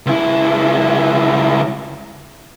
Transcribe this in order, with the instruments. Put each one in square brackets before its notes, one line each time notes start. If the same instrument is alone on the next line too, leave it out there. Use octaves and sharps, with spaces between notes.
[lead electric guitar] C#2 E4